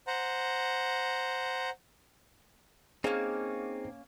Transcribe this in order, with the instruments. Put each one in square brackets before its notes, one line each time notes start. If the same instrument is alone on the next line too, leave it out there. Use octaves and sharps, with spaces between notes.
[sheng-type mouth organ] C5 F#5 A#5
[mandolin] A#3 C#4 [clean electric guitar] C4 D#4 [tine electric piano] G#4